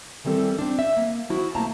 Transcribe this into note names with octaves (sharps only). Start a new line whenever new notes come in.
D#3 E3 G3 C4 A4
C4 D4
E5
A#3
F3 E4 F#4
B2 F3 A3 A#3 A5 A#5